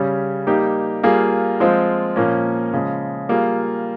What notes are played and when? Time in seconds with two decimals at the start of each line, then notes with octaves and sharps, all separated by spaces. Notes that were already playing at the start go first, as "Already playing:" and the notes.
Already playing: C#3 G3 C#4
0.47 G3 A#3 D#4 G4
1.03 G3 A#3 F4 G#4
1.60 F3 G#3 C4 F4
2.16 A#2 F3 A#3 C#4
2.73 C#3 F3 G#3
3.29 G3 A#3 F4 G#4